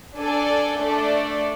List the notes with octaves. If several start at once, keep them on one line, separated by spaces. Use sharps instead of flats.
D4 A4 D5 G#5
A3 D4 A4 D5